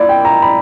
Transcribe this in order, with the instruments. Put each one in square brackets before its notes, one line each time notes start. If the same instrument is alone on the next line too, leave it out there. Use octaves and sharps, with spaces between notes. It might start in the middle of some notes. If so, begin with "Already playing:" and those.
Already playing: [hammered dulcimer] A#2 A#3 E4 [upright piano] D5
[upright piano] G5
A#5
B5